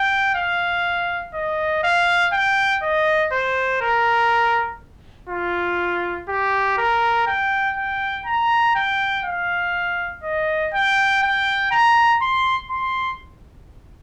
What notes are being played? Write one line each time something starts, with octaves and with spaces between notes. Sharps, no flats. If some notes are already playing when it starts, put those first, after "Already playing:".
Already playing: G5
F5
D#5
F5
G5
D#5
C5
A#4
F4
G4
A#4
G5
G5
A#5
G5
F5
D#5
G5
G5
A#5
C6
C6